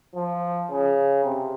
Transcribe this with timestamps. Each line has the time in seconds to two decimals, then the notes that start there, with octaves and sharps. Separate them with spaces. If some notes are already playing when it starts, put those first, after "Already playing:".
0.15 F3
0.71 C#3
1.25 C3